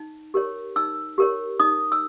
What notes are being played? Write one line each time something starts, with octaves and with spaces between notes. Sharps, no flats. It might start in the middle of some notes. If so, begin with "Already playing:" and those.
Already playing: D#4
G4 A#4 C#5
D#4 E6
G4 A#4 C#5
D#4 D#6
E6